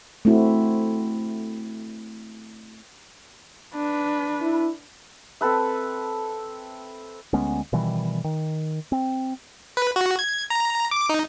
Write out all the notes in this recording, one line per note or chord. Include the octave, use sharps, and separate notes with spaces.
A3 C4 E4 F#4
D4 B4
E4
C4 A4 B4 E5
D2 G#3 B3 C#4
B2 D#3 E3 G3
D#3
C4
B4
F#4
G#6
A#5
D6
D#4